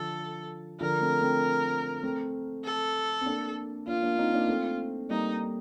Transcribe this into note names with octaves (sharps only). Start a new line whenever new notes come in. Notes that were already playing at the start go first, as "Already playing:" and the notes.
Already playing: D3 F3 A4
D3 F3 A#4
A3 C4
A3 C4
A3 C4
A4
C4
A#3 D4
A#3 D4 F4
A#3 D4
C4 D#4
A#3 D4
A3 C4
G3 A#3 D#4